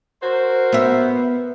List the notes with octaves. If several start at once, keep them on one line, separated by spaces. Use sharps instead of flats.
F#4 A#4 C5
B3 E5